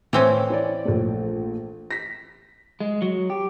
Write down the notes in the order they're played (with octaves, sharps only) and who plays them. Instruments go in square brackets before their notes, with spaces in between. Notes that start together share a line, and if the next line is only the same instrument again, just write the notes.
[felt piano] A2 [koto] E3 C4 C#4
[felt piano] E4 C#5 D5
A#1 A3
A#6 B6
[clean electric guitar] G#3
F#3
G4